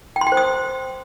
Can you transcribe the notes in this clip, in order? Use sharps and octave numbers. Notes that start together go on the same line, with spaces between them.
G5
C6
G5
C5
D#6